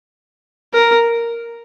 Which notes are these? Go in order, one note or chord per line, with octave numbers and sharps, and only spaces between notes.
A#4